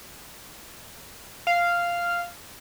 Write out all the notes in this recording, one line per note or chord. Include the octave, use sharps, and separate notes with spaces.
F5